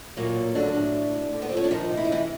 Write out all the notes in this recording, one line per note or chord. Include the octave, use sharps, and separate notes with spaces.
A#2 F#3 A#3
A2
D3 F#3 D4
A2
D2
D2
D3
B3
C4
F3 C#4
D4
D#3 F3 D#4
C3
E4
D#4
C3 E3 E4